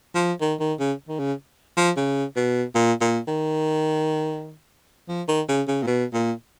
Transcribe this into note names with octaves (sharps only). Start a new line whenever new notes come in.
F3
D#3
D#3
C#3
D#3
C#3
F3
C#3
B2
A#2
A#2
D#3
F3
D#3
C#3
C#3
A#2
B2
A#2